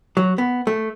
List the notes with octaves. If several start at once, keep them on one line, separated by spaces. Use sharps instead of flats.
F#3
B3
A3